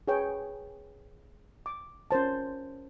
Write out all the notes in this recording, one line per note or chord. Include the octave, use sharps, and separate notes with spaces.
G#4 B4 C#5 G5 G#5
D6
C#4 A#4 C5 A5